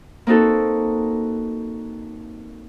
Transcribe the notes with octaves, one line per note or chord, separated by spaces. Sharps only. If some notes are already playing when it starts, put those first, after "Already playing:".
A#3 C4 D#4 F#4 A4